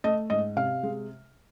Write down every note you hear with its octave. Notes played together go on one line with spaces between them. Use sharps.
A3 D#5
G#2 D#5
C3 F5
G#3